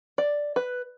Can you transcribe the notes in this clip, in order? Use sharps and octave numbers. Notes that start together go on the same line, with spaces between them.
D5
B4